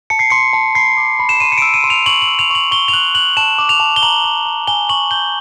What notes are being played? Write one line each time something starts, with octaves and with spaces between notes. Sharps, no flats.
A5 C#7
C7
C6 C#7
A5
B5 C7
D6
B5
E7
C6 D#7
C#7
D7
E6
D#7
C6
F7
C#6 F#7
F#7
E6
F7
C#6 F#7
C#6 G7
F7
F#6 F#7
F#6 F#7
A5 E7
D6
F7
A5
G7
A#5 F#7
D6
A#5
G#5 G7
C#6 F#7
G6 G7